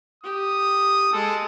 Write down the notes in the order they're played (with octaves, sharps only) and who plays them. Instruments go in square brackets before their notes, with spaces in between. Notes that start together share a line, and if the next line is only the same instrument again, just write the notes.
[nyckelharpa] G4 [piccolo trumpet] D#6
[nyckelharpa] G#3 [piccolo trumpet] A4